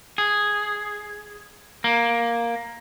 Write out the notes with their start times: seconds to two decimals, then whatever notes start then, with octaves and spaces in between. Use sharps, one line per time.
0.18 G#4
1.84 A#3